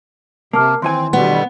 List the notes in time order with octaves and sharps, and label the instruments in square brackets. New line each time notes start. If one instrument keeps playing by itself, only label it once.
[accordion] C3 [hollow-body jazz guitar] A#3 [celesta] A5 D6 F6
[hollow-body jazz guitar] D#2 E3 G#5 [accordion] C4 [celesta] C6
[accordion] B2 D3 G3 [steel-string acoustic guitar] B3